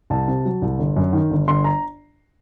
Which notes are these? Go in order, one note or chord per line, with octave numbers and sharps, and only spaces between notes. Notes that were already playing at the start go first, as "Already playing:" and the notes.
C2 A5
C3
F#3
C2
G1
F#2
D#3
G1
G1 C6
A#5